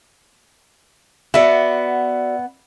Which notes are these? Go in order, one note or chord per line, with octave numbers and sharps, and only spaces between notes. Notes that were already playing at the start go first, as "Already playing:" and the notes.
B3 F#4 D5 E5 F#5